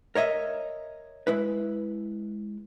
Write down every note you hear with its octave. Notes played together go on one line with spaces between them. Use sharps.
A#4 C#5 D#5 E5
G#3 E4 B4